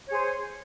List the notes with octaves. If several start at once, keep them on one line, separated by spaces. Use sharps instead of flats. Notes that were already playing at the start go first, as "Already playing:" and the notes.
G#4 C5 C#5